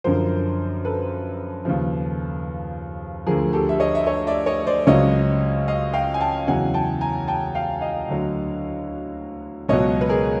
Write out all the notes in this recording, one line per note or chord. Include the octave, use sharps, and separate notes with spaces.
F#2 D3 F3 A#4 C5
A4 B4
D#2 C#3 F3
D2 D3 F3 G#4 A#4
G4 A4
E5
C#5 D#5
E5
C#5 D#5
D5 E5
C#5 D#5
C5 D5
C#2 C#3 F#3 C#5 D#5
D#5 F5
F5 G5
G#5
G5 A5
E2 C#3 F#3 F#5 G#5
G5 A5
G#5 A#5
G5 A5
F5 G5
D#5 F5
D2 D3 F#3
C#2 B2 F#3 C#5 D#5
B4
G#4 A#4